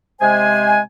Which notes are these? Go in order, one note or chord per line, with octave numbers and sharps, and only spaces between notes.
C3 G#3 C5 G#5